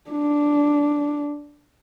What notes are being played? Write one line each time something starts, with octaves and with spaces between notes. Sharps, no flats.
D4